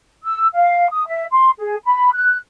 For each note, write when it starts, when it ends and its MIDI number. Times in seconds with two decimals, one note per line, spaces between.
0.23 0.47 88
0.54 0.87 77
0.91 1.04 87
1.06 1.25 76
1.31 1.51 84
1.59 1.76 68
1.85 2.09 83
2.13 2.38 90